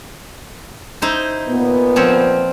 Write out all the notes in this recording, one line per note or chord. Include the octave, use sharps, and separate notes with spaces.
D#4 E4 C5
A#2 B3
F3 C4 C#5